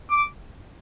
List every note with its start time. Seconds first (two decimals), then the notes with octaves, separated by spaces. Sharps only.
0.11 D6